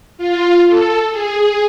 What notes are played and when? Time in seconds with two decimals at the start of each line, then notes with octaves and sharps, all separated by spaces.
0.18 F4
0.67 A4
1.11 G#4